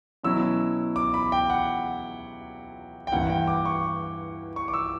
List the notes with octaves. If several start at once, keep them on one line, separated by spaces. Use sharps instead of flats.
B2 F#3 C#4 E4 E6
D6
B5
G5
F#5
G5
G2 E3 A#3 E4 F#5
G5
D6
C#6
C#6
D6
E6